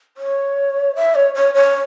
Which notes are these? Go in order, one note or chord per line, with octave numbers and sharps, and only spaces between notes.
C#5
E5
C#5
C#5
C#5